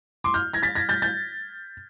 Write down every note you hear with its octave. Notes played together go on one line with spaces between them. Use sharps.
C6 D6
F6 G6
G#6 A#6
A6 B6
G#6 A#6
G6 A6
G6 A6